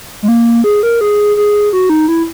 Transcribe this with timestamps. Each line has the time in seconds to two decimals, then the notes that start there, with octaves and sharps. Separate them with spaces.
0.23 G#3
0.28 A#3
0.64 G#4
0.83 A#4
1.01 G#4
1.37 G#4
1.73 F#4
1.90 D#4
2.08 E4